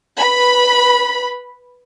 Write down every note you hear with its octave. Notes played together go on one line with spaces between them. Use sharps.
B4 B5